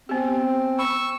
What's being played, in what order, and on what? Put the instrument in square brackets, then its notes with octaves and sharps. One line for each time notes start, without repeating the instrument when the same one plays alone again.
[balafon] B3 G4 [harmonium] C4
[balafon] B5 [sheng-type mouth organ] C#6 E6